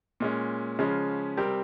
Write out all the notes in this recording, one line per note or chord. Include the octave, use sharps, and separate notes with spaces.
A#2 G#3 C#4
C#3 F3 G#3 C#4
C3 G3 C4 G4 A#4